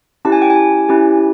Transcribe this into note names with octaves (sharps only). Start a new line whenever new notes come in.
C#4 E4 G4 A5
G#5
G5
G#5
C#4 E4 G4